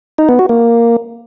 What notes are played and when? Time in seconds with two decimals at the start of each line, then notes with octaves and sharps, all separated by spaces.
0.18 D#4
0.29 B3
0.39 F#4
0.49 A#3